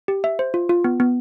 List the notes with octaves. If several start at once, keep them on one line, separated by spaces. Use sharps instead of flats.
G4
E5
C5
F4
F4
B3
B3